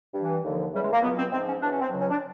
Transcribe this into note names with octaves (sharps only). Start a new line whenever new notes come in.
G2 E3
D#2 D3 F3
E2 C#3 E3 G3
G#3
A#3
C#2 B2 F#3 B3
C4
G#2 F3 C4
C#4
E2 B2 F#3 D4
C#4
C4
C#2 C#3 F#3
C#4
D4